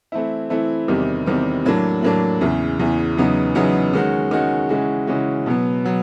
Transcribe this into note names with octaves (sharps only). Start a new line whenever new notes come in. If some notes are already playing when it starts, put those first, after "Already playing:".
E3 A3 C4 E4
E3 A3 C4 E4
E2 C3 D#3 G3 C4
E2 C3 D#3 G3 C4
A2 F#3 A#3 D4
A2 F#3 A#3 D4
E2 C#3 E3
E2 C#3 E3
E2 C#3 F#3 B3 D#4
E2 C#3 F#3 B3 D#4
D#3 G#3 C#4 F#4
D#3 G#3 C#4 F#4
C#3 E3 G#3 C#4 F#4
C#3 E3 G#3 C#4 F#4
B2 F#3 B3
F#3 B3